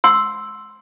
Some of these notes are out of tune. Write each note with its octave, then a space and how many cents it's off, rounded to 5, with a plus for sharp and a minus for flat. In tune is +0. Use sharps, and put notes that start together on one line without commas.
F#5 +0 C6 +0 E6 +0